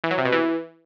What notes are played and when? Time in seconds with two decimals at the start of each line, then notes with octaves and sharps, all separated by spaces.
0.04 E3
0.11 F#3
0.18 C3
0.25 B2
0.32 E3